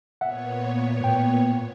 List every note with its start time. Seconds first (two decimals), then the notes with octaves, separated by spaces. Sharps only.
0.21 A#2 B3 C#5 E5 F#5
1.00 A2 G5